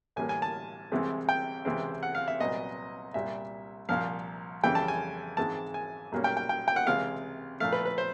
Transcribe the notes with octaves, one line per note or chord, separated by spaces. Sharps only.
A2 E3 G3 A#3 G#5
G#5
A5
C2 C3 E3 G#3 C4
G5
C#2 C3 E3 G#3 C4
F#5
F5
E5
C2 A#2 F#3 B3 D#5
C2 A#2 G3 E5
C2 A#2 F3 F5
F2 C#3 E3 G3 G5
A5
G#5
G#2 E3 G#3 C4 A5
G#5
B1 A#2 G3 A#3 C#4
G5
G5
G5
G5
F#5
C#2 C3 E3 G#3 F5
A#2 F3 A3 F5
B4
B4
C5